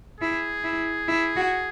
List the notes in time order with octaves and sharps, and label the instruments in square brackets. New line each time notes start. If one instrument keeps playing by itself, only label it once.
[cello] E4 [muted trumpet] G#4
[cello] E4
E4
F#4